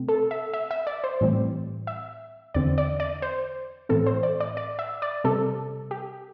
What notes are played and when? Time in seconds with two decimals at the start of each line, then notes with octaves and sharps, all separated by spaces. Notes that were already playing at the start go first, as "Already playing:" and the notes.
Already playing: C3 A3 C4
0.09 A4
0.31 E5
0.53 E5
0.71 E5
0.87 D5
1.04 C5
1.21 A2 E3 G3 C4
1.87 E5
2.54 E2 D3 C4 D5
2.78 D5
3.00 D5
3.22 C5
3.89 A2 E3 C4 A4
4.06 C5
4.23 D5
4.40 D5
4.57 D5
4.79 E5
5.02 D5
5.24 C3 G3 C4 A4
5.91 G4